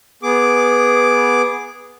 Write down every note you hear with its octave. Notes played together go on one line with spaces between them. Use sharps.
B3 G#4 D6